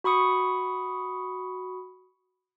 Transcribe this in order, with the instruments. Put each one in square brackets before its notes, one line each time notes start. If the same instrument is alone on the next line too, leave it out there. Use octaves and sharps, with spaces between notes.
[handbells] F#4 B5 C#6 D#6 C#7